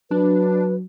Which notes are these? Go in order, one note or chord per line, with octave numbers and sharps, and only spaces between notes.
F#3 D4 B4